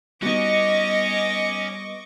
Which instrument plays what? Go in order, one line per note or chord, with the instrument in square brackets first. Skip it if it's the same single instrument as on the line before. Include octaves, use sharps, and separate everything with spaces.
[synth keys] G3 B3 [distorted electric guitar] C#4 [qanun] D#4 F#4 [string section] D#5 C#6 D6